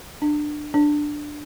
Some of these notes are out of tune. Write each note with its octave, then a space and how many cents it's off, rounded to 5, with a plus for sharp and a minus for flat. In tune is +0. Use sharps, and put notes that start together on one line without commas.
D4 +20
D4 +5